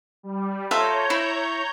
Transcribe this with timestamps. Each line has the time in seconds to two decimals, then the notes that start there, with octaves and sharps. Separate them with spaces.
0.23 G3
0.71 F4 A4 C#5 E5 A#5 G6
1.10 E4